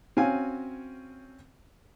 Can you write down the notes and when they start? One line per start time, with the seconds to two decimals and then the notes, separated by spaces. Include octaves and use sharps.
0.17 C4 C#4 F#4 F5 G#5